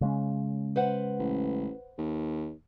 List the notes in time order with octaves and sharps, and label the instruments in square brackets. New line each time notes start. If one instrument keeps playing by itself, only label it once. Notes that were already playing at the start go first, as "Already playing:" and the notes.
[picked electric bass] C#3 G#3 C#4
[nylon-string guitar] B4 C5 F#5
[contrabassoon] A1
D#2